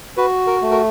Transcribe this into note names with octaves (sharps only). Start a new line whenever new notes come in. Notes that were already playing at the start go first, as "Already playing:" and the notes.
F#4 B4
A#4
A3
A#4